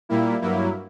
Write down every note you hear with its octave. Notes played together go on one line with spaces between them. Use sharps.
A#2 G3 A#3 E4
G2 F#3 A#3 E4